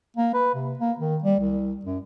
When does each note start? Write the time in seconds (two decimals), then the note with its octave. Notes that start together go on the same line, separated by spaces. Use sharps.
0.17 A#3
0.34 B4
0.54 C3
0.79 A#3
0.99 D#3
1.23 G3
1.39 C2
1.85 F#2